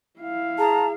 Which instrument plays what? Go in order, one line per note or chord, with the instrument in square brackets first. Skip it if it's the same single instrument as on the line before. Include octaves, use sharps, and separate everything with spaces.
[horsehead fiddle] E4 F5
[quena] G#4 [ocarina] A5 [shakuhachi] A#5